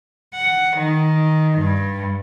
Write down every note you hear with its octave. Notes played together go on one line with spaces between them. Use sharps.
F#5
D#3
G2